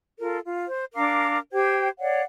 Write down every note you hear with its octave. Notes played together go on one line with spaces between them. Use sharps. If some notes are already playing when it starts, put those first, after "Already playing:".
F4 A4 A#4
F4
C5
D4 A#4 F5 D6
G4 C5 G5 G#6
C#5 D5 F5 F#5